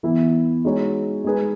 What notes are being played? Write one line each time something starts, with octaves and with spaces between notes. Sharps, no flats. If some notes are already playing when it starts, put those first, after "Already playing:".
E3 B3 E4
G#3 D#4 F#4 C#5
G#3 D#4 G#4 B4